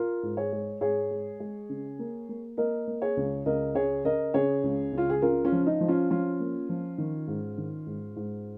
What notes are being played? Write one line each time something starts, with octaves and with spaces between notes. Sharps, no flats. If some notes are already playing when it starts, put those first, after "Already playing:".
Already playing: F4 A#4
G#2
G#4 C#5
G#3
G#2 G#4 C#5
G#3
G#3
C#3
A#3
A#3
A#3 A#4 D#5
A#3
G#4 C#5
C#2
C#2 A#4 D#5
C#3 G#4 C#5
C#3 A#4 D#5
C#3 G#4 C#5
C#2
C#2 F4
G#4
C#3 F4 A#4
C#4 F4
F3
D#4
F3
C#4 F4
F3 C#4 F4
A#3
F3
D#3
G#2
D#3
G#2
G#2